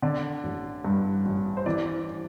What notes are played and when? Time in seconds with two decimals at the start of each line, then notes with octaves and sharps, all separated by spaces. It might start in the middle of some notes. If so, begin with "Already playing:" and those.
0.02 D3 D5
0.44 A1
0.85 G2
1.26 A1
1.57 C5
1.66 E3 D5